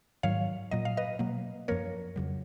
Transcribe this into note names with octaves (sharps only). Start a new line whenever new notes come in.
G#2 D#3 F#3 C#5 F5
A#2 F#3 A#3 D#5
F5
B4 D#5
B2 F#3 A#3
F#2 F3 A#3 A#4 C#5
F2 C#3 F#3